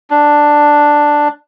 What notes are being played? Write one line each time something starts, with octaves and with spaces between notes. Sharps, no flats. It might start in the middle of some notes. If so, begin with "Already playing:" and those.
D4